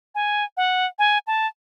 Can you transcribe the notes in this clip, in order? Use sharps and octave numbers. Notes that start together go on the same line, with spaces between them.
G#5
F#5
G#5
A5